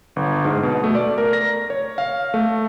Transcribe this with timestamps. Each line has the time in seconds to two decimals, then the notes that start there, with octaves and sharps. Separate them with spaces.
0.16 G1
0.45 G#2
0.63 B2
0.84 A3
0.95 D5
1.18 A#4
1.33 A#6
1.70 C#5
1.98 F5
2.34 A3